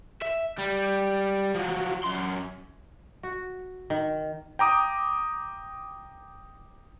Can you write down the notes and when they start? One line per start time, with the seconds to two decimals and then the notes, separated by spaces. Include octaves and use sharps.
0.22 E5
0.58 G3
1.55 F3 F#3
2.04 F#2 C6
3.23 F#4
3.90 D#3
4.59 G5 A#5 D6 D#6